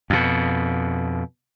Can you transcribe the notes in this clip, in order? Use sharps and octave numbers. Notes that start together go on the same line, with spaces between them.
F2 B2